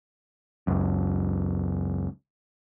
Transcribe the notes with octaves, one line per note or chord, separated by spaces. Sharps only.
F#1 C#2 F#2